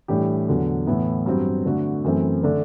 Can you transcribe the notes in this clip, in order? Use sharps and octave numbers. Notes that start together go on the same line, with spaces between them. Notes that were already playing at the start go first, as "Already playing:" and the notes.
A2 E3 G3 D4 G4
E2 D3 F#3
A2 E3 B3 E4
G2 F#3 C4
D3 A3 D4 F#4
F#2 E3 A3 C4
D3 A3 D4